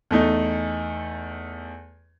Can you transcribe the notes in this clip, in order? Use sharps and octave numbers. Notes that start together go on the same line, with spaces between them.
E2 A3 D#4